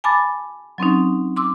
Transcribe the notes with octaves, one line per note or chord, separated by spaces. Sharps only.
G#5 A5 B5 D6 A6
F#3 C4 C#4 D#4
C6 D6 E6